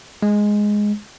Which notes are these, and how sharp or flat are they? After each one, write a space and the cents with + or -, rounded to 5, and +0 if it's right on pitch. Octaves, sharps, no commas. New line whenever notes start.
G#3 +0